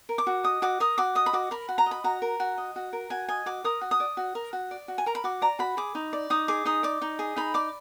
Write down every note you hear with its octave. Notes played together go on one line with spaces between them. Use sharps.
A#4
D6
F#4
D#5 D#6
F#4 D6
A#4 D#6
F#4 D6
D#5 D#6
B5
F#4 D6
A#4 B5
F#4
A#5
D#5
B5
F#4 A#5
A#4
F#4
D#5
F#4
A#4
F#4 G#5
D#5 G#5
F#4 D6
A#4 D#6
F#4
D#6
D5
F#4
A#4
F#4
D5
F#4
G#5
A#4 A#5
B5
F#4 D6
D5 A#5
F#4 B5
G#4 D6
D#4
D5
D#4 D#6
G#4 D6
D#4 D#6
D5 D6
D#4
G#4
D#4 B5
D5 D6